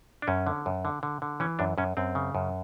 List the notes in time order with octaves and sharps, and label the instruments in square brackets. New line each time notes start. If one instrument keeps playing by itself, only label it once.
[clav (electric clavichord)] D4
F#2 C#4
D3
F#2
D3
D3
D3
E3 C#4
F#2 D4
F#2 C#4
F#2 C4
C#3
F#2